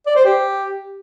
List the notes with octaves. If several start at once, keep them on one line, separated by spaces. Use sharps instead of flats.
D5
C5
G4